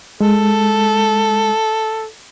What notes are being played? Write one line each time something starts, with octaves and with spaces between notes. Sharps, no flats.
G#3 A4